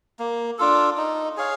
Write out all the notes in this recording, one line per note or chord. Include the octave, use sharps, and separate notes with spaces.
A#3
D4 F4 A4
D#4
G#4 C#5 F5